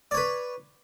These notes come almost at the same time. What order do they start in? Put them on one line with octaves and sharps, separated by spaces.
D5 C#5 B4